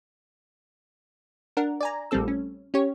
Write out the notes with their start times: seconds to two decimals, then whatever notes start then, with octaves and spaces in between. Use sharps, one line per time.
1.57 D4 A#4 F#5
1.81 D5 G#5 A#5
2.11 A#1 G3 A3 C4 A4 E6
2.28 C#4
2.74 C#4 G4 C#5